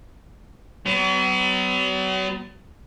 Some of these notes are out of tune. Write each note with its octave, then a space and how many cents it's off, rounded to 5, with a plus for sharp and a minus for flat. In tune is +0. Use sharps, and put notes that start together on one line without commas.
F#3 +40 B3 +40